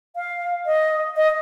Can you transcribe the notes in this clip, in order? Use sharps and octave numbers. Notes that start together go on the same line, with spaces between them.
F5
D#5
D#5